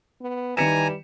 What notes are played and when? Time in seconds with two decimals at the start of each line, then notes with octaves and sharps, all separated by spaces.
0.21 B3
0.57 D#3 E3 G3 G#5 A#5 C#7 E7